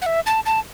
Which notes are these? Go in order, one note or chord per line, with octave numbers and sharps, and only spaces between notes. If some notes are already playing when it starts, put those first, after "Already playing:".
F#5
E5
A5
A5